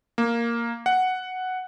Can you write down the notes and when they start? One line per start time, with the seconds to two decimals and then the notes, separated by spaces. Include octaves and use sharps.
0.18 A#3
0.86 F#5